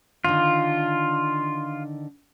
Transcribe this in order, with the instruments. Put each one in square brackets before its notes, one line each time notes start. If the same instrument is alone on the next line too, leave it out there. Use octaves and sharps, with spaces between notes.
[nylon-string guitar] D3 D#3 [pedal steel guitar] F4